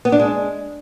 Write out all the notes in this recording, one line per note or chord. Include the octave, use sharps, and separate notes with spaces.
B3
D4
G#3